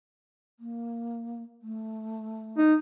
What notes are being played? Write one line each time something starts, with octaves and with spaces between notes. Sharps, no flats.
A#3
A3
D#4